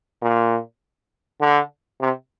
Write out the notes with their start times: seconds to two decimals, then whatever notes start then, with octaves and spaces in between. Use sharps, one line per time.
0.22 A#2
1.41 D3
2.01 C3